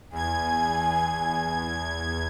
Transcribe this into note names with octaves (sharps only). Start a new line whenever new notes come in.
E2 G#5 G#6